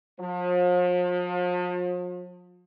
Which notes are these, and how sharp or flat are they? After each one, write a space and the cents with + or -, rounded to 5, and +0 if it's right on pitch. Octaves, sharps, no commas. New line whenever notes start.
F3 +40